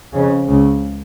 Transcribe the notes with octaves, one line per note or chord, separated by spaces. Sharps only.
F2 C#3
C#2 C#3